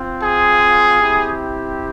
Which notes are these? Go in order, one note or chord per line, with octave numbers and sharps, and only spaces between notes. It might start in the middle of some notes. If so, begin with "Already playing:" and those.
Already playing: C4 F4
G#4
C4 E4 G4